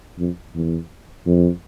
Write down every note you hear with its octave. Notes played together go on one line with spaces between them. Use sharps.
F2
E2
F2